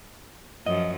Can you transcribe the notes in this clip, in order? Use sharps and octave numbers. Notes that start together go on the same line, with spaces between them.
F#2 F3 D#5